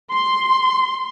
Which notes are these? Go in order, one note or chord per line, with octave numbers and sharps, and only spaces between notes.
C6